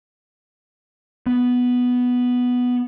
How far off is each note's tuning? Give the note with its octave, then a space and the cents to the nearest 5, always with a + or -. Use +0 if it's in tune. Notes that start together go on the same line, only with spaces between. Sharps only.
B3 +0